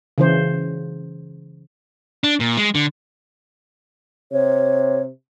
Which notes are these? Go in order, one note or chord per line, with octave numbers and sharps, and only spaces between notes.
C#3 E3 C5
D4
A#2
G#3
D3
C3 C#5